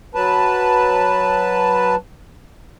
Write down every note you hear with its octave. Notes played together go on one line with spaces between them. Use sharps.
F#3 B4 A5